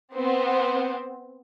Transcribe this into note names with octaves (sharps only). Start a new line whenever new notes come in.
B3 C4